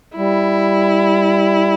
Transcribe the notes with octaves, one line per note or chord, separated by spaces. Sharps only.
G3 E4